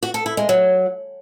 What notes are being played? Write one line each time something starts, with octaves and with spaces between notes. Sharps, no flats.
F#4
A4
E4
G#3
F#3